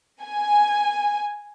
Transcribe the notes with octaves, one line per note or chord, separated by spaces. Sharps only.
G#5